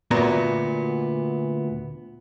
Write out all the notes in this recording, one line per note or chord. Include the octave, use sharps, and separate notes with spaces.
D2 A#2 B3 F#4 A#5